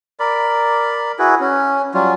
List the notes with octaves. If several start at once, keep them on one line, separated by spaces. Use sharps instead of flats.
A#4 D5 B5
E4 F#4 G#4 B4
C#4
F#3 G3 C#4 F4